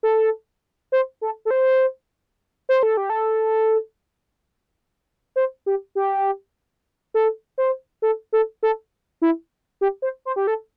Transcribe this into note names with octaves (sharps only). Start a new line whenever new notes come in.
A4
C5
A4
A4
C5
C5
A4
G4
A4
C5
G4
G4
A4
C5
A4
A4
A4
E4
G4
C5
C5
G4
A4